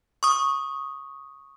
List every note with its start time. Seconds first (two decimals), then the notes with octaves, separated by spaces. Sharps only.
0.23 C#6 D#6